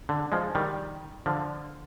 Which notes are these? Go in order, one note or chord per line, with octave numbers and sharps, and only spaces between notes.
D3
F3 G#3
D#3 G3
D3 F3